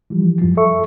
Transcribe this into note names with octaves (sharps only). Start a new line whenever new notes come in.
E3 F3 G3
F#2 F3
A4 E5 C#6